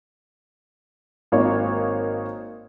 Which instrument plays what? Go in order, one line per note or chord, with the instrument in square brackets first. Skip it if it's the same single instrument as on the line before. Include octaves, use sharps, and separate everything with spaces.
[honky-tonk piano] G#1 A#3 D#4 C#5